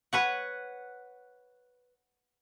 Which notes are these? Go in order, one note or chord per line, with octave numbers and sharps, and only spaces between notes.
B4 C#5 F#5